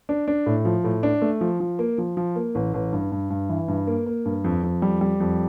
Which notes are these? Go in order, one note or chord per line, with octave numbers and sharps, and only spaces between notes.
D4
D4
A2
F3
A2
D4
A3
F3
F3
A#3
F3
F3
A#3
A1
A1
G2
G2
G2
E3
G2
A#3
A#3
G2
F2
F2
G3
G3
F2